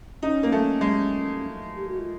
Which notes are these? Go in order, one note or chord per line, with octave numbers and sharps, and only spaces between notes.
C#4 D#4
A#3
A3
G#3
G4
F#4
F4